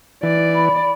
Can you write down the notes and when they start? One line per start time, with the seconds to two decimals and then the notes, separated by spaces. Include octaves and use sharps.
0.23 E3 D5
0.55 B5